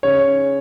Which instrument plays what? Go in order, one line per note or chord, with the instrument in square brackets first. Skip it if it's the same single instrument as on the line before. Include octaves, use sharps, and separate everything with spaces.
[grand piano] C#3 C#5